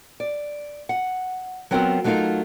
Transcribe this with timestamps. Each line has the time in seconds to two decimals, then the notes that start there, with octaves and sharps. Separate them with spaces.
0.20 D5
0.89 F#5
1.71 F#3 B3 C4 F4 F#4 A#4
2.04 F#3 A3 B3 D#4 F4 A#4